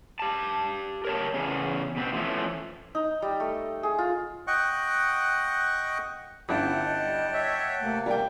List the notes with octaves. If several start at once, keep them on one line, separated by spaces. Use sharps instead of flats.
G4 A5
A#4 C#5 A5
E2 C#3 C#4
B2 B3 C4
E3 F3 A3 C#4
D#4
G3
A3
G#4
F4
D#5 F#5 G5 C#6 F#6
G1 C#4 E4 F#5 G5 A5
D#5
G3
C#5 E5
C3 A3 A#3
G3 A#4 G5